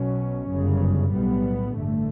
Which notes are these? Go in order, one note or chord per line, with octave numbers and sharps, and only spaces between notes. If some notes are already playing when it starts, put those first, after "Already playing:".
Already playing: B1 B2 F#3 C#4
G1 F#2 C#3
B1 A2 G3 B3
A1 G2 D3 A3